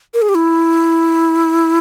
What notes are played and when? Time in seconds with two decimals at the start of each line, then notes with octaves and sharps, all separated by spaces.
0.14 A#4
0.22 G#4
0.29 G4
0.35 E4